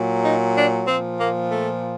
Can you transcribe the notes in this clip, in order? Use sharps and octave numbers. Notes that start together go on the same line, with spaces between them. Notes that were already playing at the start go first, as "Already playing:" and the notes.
Already playing: A#2 F#3
D#4
D4
A#2 F3 C4
A#3
A3